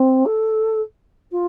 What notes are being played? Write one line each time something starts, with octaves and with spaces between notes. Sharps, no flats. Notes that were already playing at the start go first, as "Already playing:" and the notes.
Already playing: C4
A4
F4